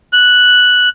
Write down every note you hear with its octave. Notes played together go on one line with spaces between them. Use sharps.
F#6